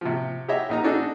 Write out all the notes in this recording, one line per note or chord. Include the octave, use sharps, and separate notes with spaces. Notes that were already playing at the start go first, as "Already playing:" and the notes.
C3 F3
G4 G#4 C#5 D#5 E5
A#1 D#4 A#5
D4 D#4 F#4 G#4 A4